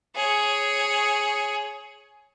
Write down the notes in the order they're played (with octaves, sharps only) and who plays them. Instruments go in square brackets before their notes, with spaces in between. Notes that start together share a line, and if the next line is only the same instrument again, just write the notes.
[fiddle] G#4 C#5